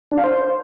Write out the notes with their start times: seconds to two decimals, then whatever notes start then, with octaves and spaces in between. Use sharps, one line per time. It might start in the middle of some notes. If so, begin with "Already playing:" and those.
0.11 D4
0.18 F5
0.24 C5